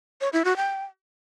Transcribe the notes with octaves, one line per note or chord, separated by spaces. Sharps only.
C#5
E4
F#4
G5